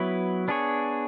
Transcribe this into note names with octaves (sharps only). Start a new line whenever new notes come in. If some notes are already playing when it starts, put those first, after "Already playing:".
Already playing: F#3 B3 E4 B4
B3 D4 G#4 C#5